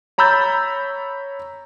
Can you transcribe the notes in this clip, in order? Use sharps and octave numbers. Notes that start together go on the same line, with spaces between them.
C#5 A#5 B5 E6 G6 A6